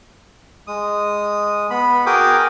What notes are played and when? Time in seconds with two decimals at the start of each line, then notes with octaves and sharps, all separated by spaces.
0.67 G#3 D#6
1.70 B3 B5
2.06 F#4 G#4 A#4 G5 D6 D#6